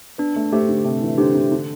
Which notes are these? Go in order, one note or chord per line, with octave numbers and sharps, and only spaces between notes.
B3 D4
A3
A3 G4 C5
D3
C3 D4
E3
D3 G4 C5
D3
D3 D4